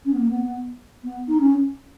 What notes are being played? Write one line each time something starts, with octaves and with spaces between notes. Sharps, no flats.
C#4
B3
A#3
B3
B3
B3
D#4
C#4